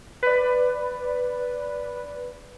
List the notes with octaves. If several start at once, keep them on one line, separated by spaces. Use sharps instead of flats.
B4 D5